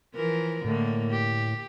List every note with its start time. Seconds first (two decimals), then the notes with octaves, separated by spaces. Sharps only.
0.15 E3 F3 A#4
0.65 A2 D3 A#3
1.11 G4